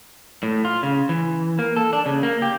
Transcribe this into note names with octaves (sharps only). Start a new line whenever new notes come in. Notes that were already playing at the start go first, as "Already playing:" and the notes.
A2
F4
C#3
E3
A#3
A4
D4
C#3
A#3
G4